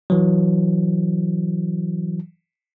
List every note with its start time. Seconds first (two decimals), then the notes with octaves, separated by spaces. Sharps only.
0.10 E3 F#3